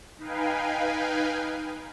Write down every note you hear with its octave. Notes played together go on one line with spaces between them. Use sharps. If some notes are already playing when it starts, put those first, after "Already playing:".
D#4 B4 F5 G5 G#5